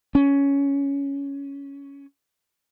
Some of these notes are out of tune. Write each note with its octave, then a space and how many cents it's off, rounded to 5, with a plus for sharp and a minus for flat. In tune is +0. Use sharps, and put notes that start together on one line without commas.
C#4 +10